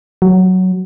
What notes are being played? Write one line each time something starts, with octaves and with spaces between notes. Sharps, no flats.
F#3